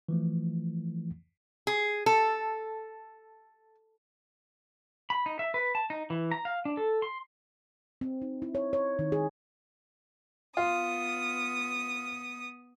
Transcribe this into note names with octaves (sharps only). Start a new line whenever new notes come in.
E3 F3 A3
G#4
A4
B5
D#4
E5
B4
A5
D#4
E3
A#5
F5
D4
A4
C6
C4
D#4
E4
C#5
C#5
D#3
G#4
B3 F4 D#6